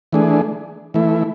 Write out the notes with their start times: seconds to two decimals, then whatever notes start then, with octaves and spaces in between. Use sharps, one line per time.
0.13 E3 A3 D4 G#4
0.94 E3 A3 E4